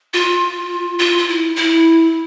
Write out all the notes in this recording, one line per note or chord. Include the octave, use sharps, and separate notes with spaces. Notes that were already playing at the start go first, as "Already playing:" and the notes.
F4
F4
F4
E4
E4